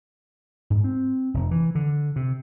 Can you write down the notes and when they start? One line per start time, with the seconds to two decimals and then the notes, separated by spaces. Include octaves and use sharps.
0.70 G#2
0.84 C4
1.34 F1
1.51 E3
1.75 D3
2.16 C3